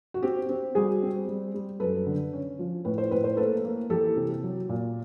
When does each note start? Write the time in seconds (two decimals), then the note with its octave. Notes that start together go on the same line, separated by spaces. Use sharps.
0.14 F#4
0.23 C4 G4
0.49 C4
0.75 G3 F#4 G#4
1.02 C4
1.28 G3
1.54 G3
1.80 F#2 A4 B4
2.06 D3
2.33 C#4
2.59 F3
2.85 A2 B4
2.98 C5
3.11 A2 B4
3.24 C5
3.37 A#3 A4 B4
3.64 A#3
3.90 E3 G4 A4
4.16 C3
4.43 F#3
4.69 A#2